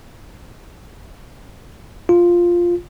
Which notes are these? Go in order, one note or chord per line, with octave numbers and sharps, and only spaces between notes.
F4